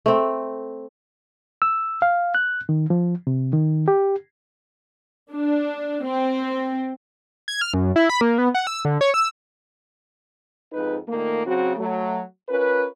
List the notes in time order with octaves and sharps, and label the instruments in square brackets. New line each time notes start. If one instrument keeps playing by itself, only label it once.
[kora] A3 C4
[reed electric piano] E6
F5
F#6
D#3
F3
C3
D#3
G4
[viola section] D4
C4
[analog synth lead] G#6
F6
F#2
E4
B5
A#3
B3
F#5
E6
D3
C#5
E6
[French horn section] F2 G#2 D#4 B4
A#2 D#3 A3 A#3
C#3 F#3 C4 F#4
F#3 A3
C#4 F4 A#4 B4